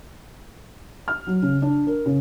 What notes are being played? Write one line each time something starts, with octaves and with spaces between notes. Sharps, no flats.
F6
F#3
C#3
D4
A#4
C#3